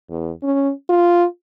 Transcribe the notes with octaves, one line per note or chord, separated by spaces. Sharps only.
E2
C#4
F4